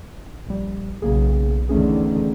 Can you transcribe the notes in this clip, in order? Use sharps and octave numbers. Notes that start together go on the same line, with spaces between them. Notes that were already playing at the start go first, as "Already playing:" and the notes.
A#1 G3
B1 C#3 A#3 G#4
E2 D3 D#3 A3 C#4 G#4